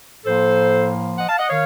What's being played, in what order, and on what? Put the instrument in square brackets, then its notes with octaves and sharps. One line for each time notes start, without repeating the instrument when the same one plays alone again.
[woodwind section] A2 F3 A#3 A4 C5
D#5 F#5
F5 A5
D#5 F#5
D#3 C#5 F5